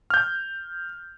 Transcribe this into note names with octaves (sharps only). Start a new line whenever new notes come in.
F6 G6